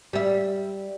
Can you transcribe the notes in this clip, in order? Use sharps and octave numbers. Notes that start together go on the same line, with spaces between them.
G3 E5